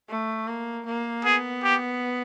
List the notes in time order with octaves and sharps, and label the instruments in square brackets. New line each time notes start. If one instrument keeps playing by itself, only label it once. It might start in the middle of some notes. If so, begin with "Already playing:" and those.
[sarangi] A3
A#3
A#3
[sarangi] B3 [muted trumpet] G#4
[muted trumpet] G4